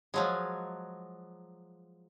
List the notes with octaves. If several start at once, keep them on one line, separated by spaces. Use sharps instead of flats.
F3 F#3 G#3